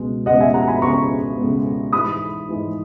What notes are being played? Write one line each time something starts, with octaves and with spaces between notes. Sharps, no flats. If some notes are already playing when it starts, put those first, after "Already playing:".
Already playing: C#2 B2 G#3 B3
C#2 B2 G#3 B3 D#5 F#5
E5 G#5
F#5 A#5
G#5 B5
C#2 B2 G#3 B3 A#5 C#6
C#2 B2 G#3 B3
G#2 E3 G#3 B5 D#6
G#2 E3 G#3